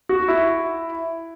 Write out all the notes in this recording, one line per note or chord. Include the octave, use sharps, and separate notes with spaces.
F#4
E4